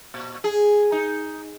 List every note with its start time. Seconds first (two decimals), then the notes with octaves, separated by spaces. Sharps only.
0.14 A#2
0.44 G#4
0.92 D#4